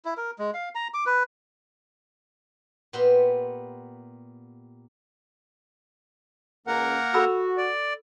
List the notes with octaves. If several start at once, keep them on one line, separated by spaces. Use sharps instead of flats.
E4
A#4
G#3
F5
A#5
D6
B4
A#2 B3 G4 B4 E5 C6
C#2 A#3 C#4 A#4 F#5
F#4 A4 B5 E6
D5